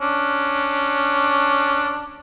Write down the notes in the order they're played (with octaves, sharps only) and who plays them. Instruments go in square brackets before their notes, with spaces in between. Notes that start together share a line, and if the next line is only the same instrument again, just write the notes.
[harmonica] C#4 D4